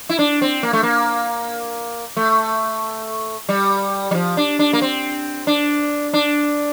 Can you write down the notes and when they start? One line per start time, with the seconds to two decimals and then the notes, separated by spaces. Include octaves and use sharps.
0.09 E4
0.19 D4
0.42 C4
0.63 A#3
0.73 A3
0.83 A#3
2.17 A3
3.49 G3
4.11 G3
4.14 F3
4.37 D4
4.59 D4
4.73 A#3
4.82 C4
5.47 D4
6.14 D4